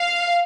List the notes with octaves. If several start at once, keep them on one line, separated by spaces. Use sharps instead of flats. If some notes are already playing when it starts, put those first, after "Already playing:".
Already playing: F5